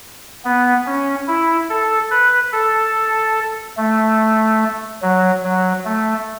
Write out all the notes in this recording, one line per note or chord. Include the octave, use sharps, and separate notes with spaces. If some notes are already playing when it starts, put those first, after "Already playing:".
B3
C#4
E4
A4
B4
A4
A3
F#3
F#3
A3